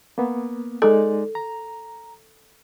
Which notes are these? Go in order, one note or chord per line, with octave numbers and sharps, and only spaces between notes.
A#3 B3
G#3 D#4 A4 D5
A#5